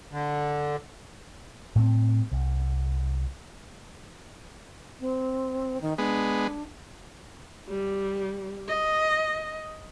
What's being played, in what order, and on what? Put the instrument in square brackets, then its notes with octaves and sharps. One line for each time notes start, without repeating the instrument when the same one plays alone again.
[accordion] D3
[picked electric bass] A2 A3 C4
C2
[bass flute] C4
D#3
[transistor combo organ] G#3 B3 [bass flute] D4
[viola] G3
D#5